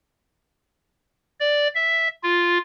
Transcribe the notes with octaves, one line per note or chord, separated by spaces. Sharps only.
D5
E5
F4